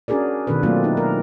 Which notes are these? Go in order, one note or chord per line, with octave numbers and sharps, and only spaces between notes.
C#4 D4 F#4 G#4 A#4 D5
B2 D#3 D4 A4 B4
F#3 A3 A#3 C4 D4 F4
D#4
A#4